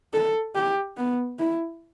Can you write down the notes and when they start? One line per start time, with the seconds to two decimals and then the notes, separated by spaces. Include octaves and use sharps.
0.13 A4
0.55 G4
0.97 B3
1.38 E4